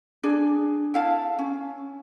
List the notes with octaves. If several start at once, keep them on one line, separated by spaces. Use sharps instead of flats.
D4 G#4
E4 F5 A5
C#4